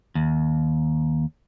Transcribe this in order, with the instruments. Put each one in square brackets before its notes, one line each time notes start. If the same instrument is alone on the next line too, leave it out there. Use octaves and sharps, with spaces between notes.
[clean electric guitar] D#2